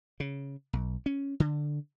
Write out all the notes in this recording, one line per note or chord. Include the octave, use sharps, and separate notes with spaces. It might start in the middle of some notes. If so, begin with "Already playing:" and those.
C#3
B1
C#4
D3